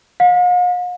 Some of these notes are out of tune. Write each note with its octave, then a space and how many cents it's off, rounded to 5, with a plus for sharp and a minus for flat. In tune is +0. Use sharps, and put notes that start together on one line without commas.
F5 +45